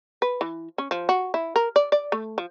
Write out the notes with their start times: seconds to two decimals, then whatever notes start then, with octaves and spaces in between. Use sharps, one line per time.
0.22 B4
0.41 E3
0.78 C#4
0.91 F3
1.09 F#4
1.34 E4
1.56 A#4
1.76 D5
1.92 D5
2.12 A3
2.38 F3